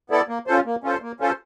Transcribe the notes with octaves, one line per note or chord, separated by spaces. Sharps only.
B3 E4 A4 D5
A#3
C#4 F4 A4 C5
A#3
C#4 F4 A4 C5
A#3
C#4 F4 A4 C5